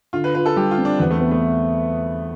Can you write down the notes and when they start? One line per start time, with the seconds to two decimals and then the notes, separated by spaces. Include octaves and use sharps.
0.13 D3 F4
0.24 B4
0.35 F4 B4
0.46 A4
0.56 G3 G4
0.71 F4
0.78 C4
0.85 D4
1.00 E2 B3
1.10 A3
1.20 B3
1.31 A3